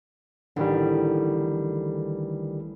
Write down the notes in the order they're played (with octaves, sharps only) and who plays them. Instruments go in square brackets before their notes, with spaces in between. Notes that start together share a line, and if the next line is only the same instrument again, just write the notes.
[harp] A1 [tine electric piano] D3 D#3 G3